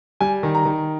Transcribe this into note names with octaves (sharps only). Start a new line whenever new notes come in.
G3 G#5
D#3
A#5
D#3